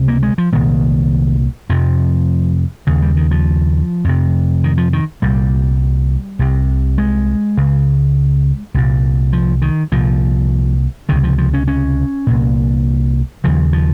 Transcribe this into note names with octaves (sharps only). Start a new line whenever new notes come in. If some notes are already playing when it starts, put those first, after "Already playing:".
Already playing: C#2 C3
A#3
G#3
F3
C2 A#2 D#3
F2 C3 F3
D#2 C#3
G3
D#3
F3
F2 C3
D#3
F3
D#3
C2 A#2 G3
C2 C3
G#3
C#2 C#3
C2 A#2
F3
D#3
C2 A#2 F3
C#2 C3 D#3
F3
F3
C#4
C#4
C2 A#2
D#2 C#3 F3
F3